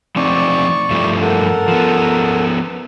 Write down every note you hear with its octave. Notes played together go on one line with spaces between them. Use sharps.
F3 C4 D#4 D5 C#6
G2 F3 A3
A4 A#4 F#5
F3 B3